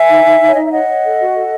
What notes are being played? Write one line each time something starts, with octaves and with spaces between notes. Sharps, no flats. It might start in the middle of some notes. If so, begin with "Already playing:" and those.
Already playing: E5 G#5
D#4
D#4
D#4
C#5
D#4 D#5
E5
C#5 D#5 F#5
C#5
A4
F#4
A4